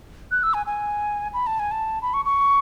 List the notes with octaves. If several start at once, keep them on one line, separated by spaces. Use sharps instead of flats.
F#6
E6
G#5
G#5
B5
A5
G#5
A5
B5
C#6
C#6